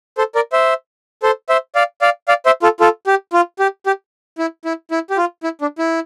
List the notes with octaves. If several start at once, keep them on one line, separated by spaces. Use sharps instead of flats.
A4 C5
A#4 D5
C5 E5
A4 C5
C5 E5
D5 F5
D5 F5
D5 F5
C5 E5
F4 A4
F4 A4
G4
F4
G4
G4
E4
E4
E4
G4
F4
E4
D4
E4